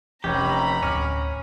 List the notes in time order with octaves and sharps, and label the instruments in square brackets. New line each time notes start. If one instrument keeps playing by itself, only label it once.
[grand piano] F1 C#4 [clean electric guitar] G4 [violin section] A#5 B5
[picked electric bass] D1 [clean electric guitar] C#4 [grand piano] D6 F6